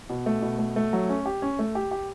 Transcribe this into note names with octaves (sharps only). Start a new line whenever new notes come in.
B2
A3
B2
A3
A3
F#3
C#4
G4
C#4
A3
G4
G4